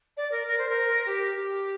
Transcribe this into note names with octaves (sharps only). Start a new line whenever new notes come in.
D5
A#4
A#4
C5
A#4
G4
G4